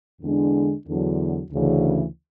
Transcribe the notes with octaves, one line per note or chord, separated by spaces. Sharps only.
E2 D3 G#3 D4
E2 D3 F#3
D2 C#3 E3